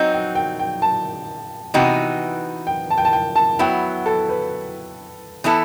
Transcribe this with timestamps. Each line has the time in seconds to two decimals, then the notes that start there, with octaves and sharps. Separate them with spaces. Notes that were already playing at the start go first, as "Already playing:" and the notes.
Already playing: F#3 C4 D#4 D#5
0.13 G5
0.35 G5
0.59 G5
0.82 A5
1.74 C3 E3 B3 D#4 F#4 G5
2.67 G5
2.90 A5
2.98 G5
3.05 A5
3.13 G5
3.36 A5
3.59 F#3 B3 E4 G5
4.06 A4
4.29 B4
5.44 E3 B3 E4 A4